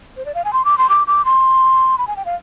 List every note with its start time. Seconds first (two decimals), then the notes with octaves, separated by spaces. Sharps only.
0.17 C5
0.26 D5
0.35 F5
0.45 G#5
0.53 C6
0.65 D6
0.78 C6
0.89 D6
1.07 D6
1.25 C6
1.98 B5
2.07 G#5
2.17 G5
2.25 F5